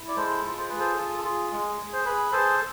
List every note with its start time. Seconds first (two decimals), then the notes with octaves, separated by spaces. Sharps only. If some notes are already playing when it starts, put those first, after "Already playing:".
Already playing: E4
0.08 D5
0.16 G#3 A4 C5
0.43 F4
0.58 C5
0.69 G#4 B4
0.79 A4 C5
0.97 F4 A4
1.17 A4
1.24 F4 G#4
1.51 G#3 G#4
1.78 G#4
1.93 C5
2.05 G#4 B4
2.32 G#4 A4 C5